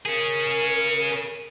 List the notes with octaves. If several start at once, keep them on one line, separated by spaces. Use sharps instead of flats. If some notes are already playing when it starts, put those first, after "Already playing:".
C#4 G#4 A#4